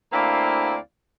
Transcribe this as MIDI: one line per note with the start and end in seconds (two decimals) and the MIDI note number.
0.12 0.77 38
0.12 0.77 58
0.12 0.77 60
0.12 0.77 64
0.12 0.77 74
0.12 0.77 77